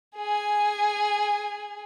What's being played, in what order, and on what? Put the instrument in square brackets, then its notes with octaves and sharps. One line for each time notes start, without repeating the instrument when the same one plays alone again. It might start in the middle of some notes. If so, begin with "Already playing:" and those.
[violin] G#4 G#5